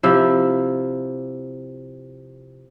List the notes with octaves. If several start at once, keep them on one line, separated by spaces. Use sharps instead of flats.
C3 F3 E4